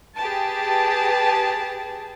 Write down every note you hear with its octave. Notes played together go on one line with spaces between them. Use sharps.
G4 G#4 B4 A5